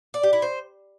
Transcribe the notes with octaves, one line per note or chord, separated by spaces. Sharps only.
D5
G4
E4
C5